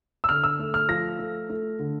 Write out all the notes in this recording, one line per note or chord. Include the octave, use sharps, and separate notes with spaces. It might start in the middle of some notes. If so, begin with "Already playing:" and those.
E6
D3 F6
E6
A3
F6
F3 A#6
A3
A3
D3